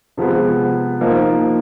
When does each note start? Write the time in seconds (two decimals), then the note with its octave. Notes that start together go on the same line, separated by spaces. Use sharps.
0.17 C3 F3 G#3 B3
1.01 F3 A#3 D#4